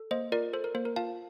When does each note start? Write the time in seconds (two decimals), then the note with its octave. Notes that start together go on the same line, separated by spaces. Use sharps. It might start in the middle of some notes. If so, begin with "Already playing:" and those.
Already playing: A4
0.11 A#3 C5 D#5
0.32 F4 A#4 D5
0.53 A4 C5
0.64 A#4
0.75 A#3 C5
0.85 A#4
0.96 F4 F5 A5